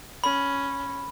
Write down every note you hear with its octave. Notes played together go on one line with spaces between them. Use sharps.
C#4 B5